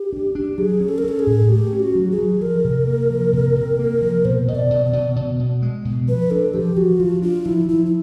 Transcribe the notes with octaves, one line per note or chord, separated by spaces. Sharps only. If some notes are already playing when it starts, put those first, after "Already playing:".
Already playing: G4
D4
D4
F#3 G#4
C#4
A4
A#4
C#4 A4
G#4
A2
A3 G4
C#4
F#4
F#3
G#4
F#3
F3 A#4
C3
A#3
F3
C3
C3
A#3
F3
B2 C5
B2 D#5
D5
B2
D5
B2
B2
B2
G#3
B2
F3 B4
D4 A4
F3 G4
F3 F#4
F3 F4
D4 F4
F3 E4
F3 E4
E4